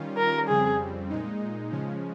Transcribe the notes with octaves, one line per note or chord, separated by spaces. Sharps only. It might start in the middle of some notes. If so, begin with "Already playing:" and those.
Already playing: D#3 G3 C#4 F4
A#4
F2 C#3 G3 C4 G#4
A#2 G#3 D#4
C#3 F3 G#3 C#4